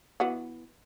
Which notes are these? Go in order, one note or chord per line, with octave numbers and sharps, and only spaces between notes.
E3 B3 F#4